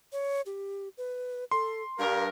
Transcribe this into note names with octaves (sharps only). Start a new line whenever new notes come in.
C#5
G4
B4
A4 C6
G2 A#4 F5